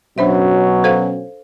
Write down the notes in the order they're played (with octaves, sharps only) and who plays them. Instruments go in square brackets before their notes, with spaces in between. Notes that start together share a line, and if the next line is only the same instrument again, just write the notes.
[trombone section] B2 F#3 C#4 [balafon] D4 C5 E5
[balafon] A4 C5 F5